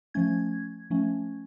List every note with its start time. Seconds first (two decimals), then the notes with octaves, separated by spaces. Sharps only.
0.14 F3 A3 C#4 G#6
0.90 F3 A3 C#4